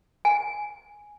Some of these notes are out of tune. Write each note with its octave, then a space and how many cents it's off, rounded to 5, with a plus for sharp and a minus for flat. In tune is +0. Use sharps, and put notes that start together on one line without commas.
G#5 -5